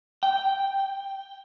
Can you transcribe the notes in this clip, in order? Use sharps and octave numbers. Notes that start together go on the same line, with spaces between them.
G5